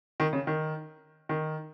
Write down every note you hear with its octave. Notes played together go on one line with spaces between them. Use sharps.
D#3
C#3
D#3
D#3